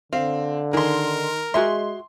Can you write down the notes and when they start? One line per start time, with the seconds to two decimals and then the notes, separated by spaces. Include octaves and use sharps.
0.13 D3 C4 F5
0.73 D#3 G#4 A#4 C6
1.54 G#3 F#4 G#4 E5 C6